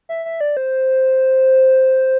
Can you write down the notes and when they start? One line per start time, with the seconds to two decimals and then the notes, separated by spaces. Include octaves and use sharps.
0.09 E5
0.25 E5
0.41 D5
0.57 C5